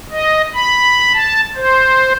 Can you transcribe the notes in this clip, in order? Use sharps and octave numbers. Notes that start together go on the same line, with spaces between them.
D#5
B5
A5
C5